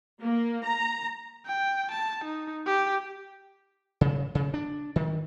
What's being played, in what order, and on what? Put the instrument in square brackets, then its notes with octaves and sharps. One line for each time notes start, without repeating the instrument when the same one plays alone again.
[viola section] A#3
A#5
[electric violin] G5
A5
D#4
G4
[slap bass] C#3
C#3
D4
D#3